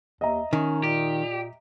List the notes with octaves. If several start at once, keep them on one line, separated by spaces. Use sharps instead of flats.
D#2 D#5 E5 A#5
D#3 C#4
A#2 G4